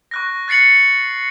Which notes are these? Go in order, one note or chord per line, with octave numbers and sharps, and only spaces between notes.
C#6 F#6 A#6
F#6 A6 C7 C#7 F#7